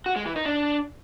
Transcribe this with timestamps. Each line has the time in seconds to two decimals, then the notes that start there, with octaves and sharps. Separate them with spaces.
0.06 F#4
0.16 G#3
0.26 E3
0.36 D#4
0.46 D4